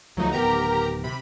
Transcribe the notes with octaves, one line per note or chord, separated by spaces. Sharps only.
D2 F3 F#3 A3 D#4
D1 D#3 B3 G4 A#4 A#5
C3 B5